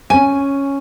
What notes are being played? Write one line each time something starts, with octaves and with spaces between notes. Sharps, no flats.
C#4 G#5 D#7